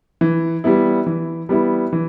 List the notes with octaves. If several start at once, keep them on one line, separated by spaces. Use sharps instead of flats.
E3
G3 B3 E4
E3
G3 B3 E4
E3